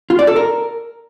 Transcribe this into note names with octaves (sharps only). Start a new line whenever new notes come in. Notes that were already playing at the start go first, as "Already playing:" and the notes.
F4
D5
A4
A#4